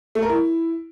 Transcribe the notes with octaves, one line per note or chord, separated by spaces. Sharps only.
A3
A#4
E4